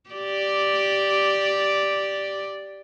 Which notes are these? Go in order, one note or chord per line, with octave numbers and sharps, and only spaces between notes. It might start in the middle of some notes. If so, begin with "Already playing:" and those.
G4 D5